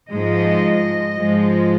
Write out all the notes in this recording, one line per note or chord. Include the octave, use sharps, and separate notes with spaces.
G#2 F3 G#3 D#5
G#2 F3 G#3